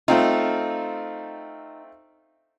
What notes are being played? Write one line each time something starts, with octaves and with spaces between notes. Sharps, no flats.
A3 C4 D#4 F4